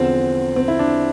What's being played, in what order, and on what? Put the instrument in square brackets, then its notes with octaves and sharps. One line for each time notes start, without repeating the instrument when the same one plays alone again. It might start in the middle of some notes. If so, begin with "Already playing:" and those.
Already playing: [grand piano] E2 D3 F3 C4
C4
E4
D4